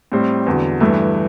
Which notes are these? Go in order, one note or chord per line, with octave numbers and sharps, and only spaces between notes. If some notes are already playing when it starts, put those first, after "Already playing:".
A2 G3 C4
E2 D3 F#3
G2 E3 A3